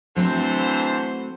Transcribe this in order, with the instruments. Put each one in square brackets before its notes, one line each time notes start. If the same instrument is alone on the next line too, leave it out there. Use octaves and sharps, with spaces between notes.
[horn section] D3 E3 C5 [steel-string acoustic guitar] F#3 A3 C4